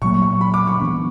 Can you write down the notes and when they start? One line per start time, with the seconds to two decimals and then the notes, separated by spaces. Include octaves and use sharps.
0.01 A#2 F#3 A#3 C#6
0.22 C#6
0.41 B5
0.54 D6
0.67 C#6
0.80 E3 B3 D4